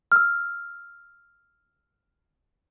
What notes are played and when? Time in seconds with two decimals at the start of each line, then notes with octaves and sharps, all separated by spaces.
0.12 E6 F6